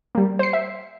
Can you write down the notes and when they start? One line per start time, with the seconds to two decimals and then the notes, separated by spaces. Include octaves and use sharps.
0.15 G3 A#3
0.39 C5 C7
0.53 E5